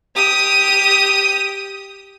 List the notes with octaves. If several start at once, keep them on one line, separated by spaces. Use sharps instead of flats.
G4 D#6